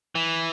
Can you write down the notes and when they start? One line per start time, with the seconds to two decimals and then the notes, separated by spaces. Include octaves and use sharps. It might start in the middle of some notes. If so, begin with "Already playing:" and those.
0.15 E3